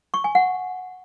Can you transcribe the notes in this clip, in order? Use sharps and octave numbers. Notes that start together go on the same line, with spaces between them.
C#6
G#5
F#5